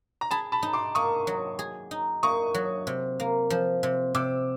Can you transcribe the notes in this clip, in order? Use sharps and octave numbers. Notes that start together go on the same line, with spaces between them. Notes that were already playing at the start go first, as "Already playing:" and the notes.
A#5
G#4 A5 B5
A5 B5
D#4
C6 D6
A#3 C#6 D#6
F#3
G#4
D#4
A#3 C#6 D#6
F#3
C3
A#3
F3
C3
C3 D6 E6